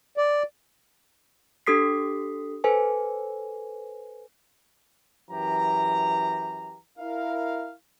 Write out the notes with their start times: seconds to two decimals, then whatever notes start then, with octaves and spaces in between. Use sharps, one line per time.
0.17 D5
1.67 D4 G4 A4 D#6 B6 C7
2.64 A4 B4 C5 G#5
5.31 F#2 E3 G4 A#5
6.99 E4 A#4 F5